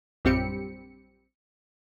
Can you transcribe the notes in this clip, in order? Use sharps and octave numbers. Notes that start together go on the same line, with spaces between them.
A#1 F#2 G3 C4 G4 C#7